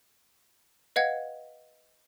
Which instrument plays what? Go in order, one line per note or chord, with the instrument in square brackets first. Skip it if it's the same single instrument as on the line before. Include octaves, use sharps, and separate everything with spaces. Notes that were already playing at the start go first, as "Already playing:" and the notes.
[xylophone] B4 D#5 F5 F#5 G#6